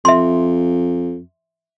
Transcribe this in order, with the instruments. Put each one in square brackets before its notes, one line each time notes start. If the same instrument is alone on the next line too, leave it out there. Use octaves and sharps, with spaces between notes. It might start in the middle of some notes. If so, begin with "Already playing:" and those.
[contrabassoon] F2 [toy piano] E5 C6